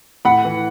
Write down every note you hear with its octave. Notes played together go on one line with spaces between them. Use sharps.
A2 F#5 B5
E3